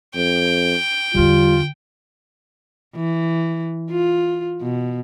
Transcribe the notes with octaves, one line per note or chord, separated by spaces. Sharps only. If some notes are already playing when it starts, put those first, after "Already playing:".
F2 G5
E2 D3 G3 F4
E3
F4
B2